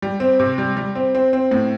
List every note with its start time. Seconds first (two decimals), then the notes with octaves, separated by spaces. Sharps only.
0.02 G3
0.20 C4
0.40 C3
0.58 G3
0.77 G3
0.95 C4
1.15 C4
1.33 C4
1.51 A2